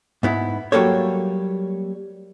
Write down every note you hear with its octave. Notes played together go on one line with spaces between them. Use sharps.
G#2 B3 E4
F#3 G3 A#3 A4 C#5